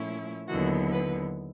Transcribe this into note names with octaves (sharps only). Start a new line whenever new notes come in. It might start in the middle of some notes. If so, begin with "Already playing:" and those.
Already playing: A#2 F3 A3 C#4 E4
D#2 D3 F#3 B3 E4 F#4
B4